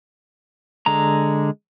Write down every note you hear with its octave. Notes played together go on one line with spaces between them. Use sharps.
D3 G#3 A#5